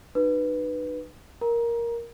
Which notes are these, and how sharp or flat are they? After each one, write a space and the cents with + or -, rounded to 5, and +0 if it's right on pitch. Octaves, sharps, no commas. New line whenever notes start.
D#4 -40 F#4 +0 B4 +0
A#4 +5 A#5 +20